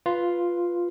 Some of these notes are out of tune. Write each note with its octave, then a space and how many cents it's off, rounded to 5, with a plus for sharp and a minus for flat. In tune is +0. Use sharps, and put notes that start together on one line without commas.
F4 +0 B4 +0